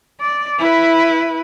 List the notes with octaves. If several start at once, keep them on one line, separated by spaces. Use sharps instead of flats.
D5
E4 B4